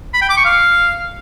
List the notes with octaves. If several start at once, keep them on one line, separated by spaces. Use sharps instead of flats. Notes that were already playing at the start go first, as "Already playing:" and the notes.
B5
G5
D6
C#6
F5